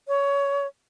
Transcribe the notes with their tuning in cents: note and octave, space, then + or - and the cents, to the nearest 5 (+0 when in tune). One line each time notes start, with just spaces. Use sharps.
C#5 +20